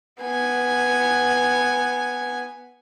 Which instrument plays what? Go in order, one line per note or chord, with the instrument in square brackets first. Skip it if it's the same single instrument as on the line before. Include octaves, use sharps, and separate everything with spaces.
[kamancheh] B3 G#5